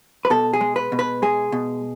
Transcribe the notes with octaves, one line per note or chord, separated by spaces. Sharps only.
B4
B2 A4
G#4
G#3
B4
B2
B4
G#3 G#4
B2